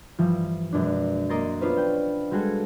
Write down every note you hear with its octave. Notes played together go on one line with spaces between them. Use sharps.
G2 E3 F3 G3
F#2 B2 G#3 D4
A#3 A#4 D#5 A#5 C6 A6
B3 C#4 D4 F4 B4 C5
G5 B5
G3 G#3 F#4 G#4 A4